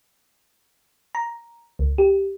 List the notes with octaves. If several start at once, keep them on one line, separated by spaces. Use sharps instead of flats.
A#5
C#2
G4